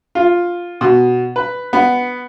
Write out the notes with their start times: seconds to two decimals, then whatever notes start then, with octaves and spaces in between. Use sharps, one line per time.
0.15 F4
0.81 B2
1.36 B4
1.73 B3